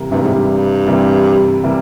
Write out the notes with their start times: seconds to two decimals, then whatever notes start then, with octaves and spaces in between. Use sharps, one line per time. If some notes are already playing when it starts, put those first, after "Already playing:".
Already playing: C3 E3 G3 A#3
0.11 G2 C3 E3 G3 A#3
0.22 G#2
0.34 G2
0.87 C3 E3 G3 A#3
1.63 C3 E3 G3 A#3